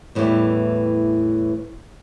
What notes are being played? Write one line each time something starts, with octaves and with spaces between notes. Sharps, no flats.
E2 A2 E3 G3 G4